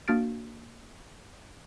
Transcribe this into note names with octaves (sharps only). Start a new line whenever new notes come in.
A#3 D4 F#4 F6 A6 D7